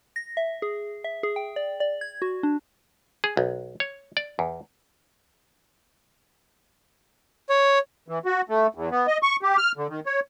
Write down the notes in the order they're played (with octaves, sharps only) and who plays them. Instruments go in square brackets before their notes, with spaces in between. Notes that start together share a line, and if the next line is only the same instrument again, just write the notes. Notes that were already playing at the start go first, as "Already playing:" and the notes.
[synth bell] A#6
E5
G#4
E5
G#4
G5
D5
D5
G#6
F#4
D4
[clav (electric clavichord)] G#4
B1
C#5
D5
E2
[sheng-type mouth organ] C#5
[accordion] E3
F#4
A3
E2
B3
D#5
C#6
G4
F6
D3
D#3
C#5